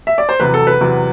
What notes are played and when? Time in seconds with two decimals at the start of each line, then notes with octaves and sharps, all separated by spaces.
0.07 E5
0.18 D5
0.29 C5
0.40 E2 C3 F#3 B4
0.54 A4
0.67 B4
0.81 E2 C3 F#3